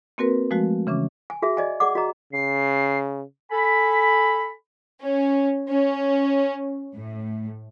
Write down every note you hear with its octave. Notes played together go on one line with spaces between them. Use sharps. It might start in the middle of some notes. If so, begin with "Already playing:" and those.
A#3 C4 F#4 A#4 B4
F3 G#3 A3 F#4
C#3 E3 C#4 D6
G#5
F#4 G#4 E5
D5 D#5 G#5
G#4 D5 F#5 D6
F#4 G#4 D#5 A#5
C#3 C7
A4 G#5 B5
C#4
C#4
A2